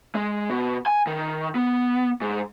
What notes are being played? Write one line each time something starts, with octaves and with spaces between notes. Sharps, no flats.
G#3
B2
G#5
D#3
B3
G#2